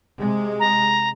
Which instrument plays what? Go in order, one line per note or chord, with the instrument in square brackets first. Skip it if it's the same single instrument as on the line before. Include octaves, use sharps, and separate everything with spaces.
[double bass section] C3 G#3
[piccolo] A#5